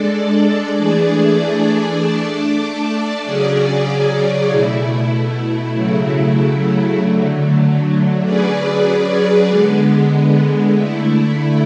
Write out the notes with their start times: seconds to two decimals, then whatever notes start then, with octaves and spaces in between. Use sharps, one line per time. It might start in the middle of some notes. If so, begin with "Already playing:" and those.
Already playing: G#3 D4 A4 D5
0.73 E3 A3 D4 G#4 D5
1.98 A3 D4 A4 D5
3.23 C#3 F#3 C#4 G#4 D5
4.49 B2 A3 E4
5.73 C#3 F#3 A3 E4
6.99 D3 F#3 A3
8.23 F#3 C#4 G#4 B4 D5
9.48 D3 G#3 B3
10.73 D3 A3 E4